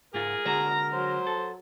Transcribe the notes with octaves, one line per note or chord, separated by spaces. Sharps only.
G#2 F4 G#4 A#4
D3 G#3 F#4 A#5
F#3 C5
A4